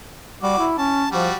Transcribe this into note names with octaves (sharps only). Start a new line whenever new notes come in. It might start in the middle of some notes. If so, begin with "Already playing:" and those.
G3 F#4 D6
E4
C#4 A5
F3 G3 F#4